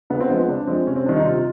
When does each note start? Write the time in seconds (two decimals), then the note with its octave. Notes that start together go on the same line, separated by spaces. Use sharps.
0.10 C#3 B3
0.20 C4
0.30 F3 G#3 B3
0.39 C4
0.48 C#3 D4
0.67 F3 G#3 C4
0.87 C3 C#4
0.96 C4
1.06 D#3 G3 D4
1.16 D#4
1.25 C3 F4